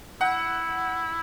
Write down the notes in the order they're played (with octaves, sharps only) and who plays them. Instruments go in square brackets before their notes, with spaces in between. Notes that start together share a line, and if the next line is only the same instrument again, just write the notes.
[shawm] E4 [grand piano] F#5